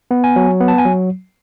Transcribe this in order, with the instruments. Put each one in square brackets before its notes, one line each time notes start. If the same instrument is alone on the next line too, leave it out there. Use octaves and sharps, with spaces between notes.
[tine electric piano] B3
G#5
F#3
B3
A5
G#5
F#3